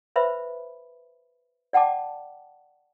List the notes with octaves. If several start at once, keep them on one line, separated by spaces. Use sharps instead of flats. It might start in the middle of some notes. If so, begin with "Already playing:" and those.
B4 C5 E5 B5
D5 F#5 G5 A5 D6